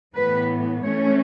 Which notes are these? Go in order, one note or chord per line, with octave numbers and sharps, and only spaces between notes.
A2 E3 B3 B4
E3 A3 C#4 C#5